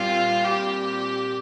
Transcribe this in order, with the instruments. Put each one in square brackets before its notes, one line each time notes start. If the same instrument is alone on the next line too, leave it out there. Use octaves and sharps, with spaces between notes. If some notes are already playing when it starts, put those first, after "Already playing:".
Already playing: [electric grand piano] A#2 G3 C4 [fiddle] F4
[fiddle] G4